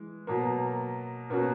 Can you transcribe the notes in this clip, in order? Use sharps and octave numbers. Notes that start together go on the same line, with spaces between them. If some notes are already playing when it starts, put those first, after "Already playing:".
Already playing: E3 G#3
B2 F#3 A#3
B2 A#3 C#4 F#4